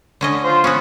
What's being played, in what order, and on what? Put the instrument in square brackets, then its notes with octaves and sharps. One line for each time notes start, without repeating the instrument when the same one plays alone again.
[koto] D3 C#4 D#5
[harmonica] F4 C5
[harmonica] B3 [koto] C#4 F#4